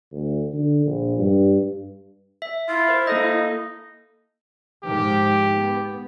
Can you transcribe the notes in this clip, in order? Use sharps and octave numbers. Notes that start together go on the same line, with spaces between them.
D2
D3
A#1
G2
E5
E4 F4
A#4 C5
A#3 D#4 A4 D#5
G#2 D#3 F3 G4
B3